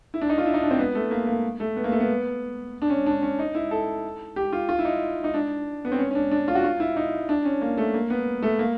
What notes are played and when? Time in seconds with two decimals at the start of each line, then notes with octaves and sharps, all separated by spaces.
0.14 E4
0.21 D4
0.29 D#4
0.38 F4
0.46 E4
0.54 D#4
0.62 D4
0.71 C4
0.78 B3
0.95 A3
1.11 A#3
1.27 A#3
1.60 A3
1.76 B3
1.84 A#3
1.92 A3
2.00 B3
2.82 D4
2.90 C#4
3.06 D4
3.22 C#4
3.39 D#4
3.55 E4
3.71 A4
4.36 G4
4.52 F4
4.69 F4
4.79 E4
4.85 D#4
5.24 D#4
5.34 D4
5.85 B3
5.92 C4
5.99 C#4
6.11 C#4
6.15 D4
6.31 D4
6.48 F4
6.55 F#4
6.64 F4
6.80 E4
6.96 D#4
7.29 D4
7.45 C#4
7.61 A#3
7.77 A3
7.94 A#3
8.10 B3
8.42 A3
8.59 A#3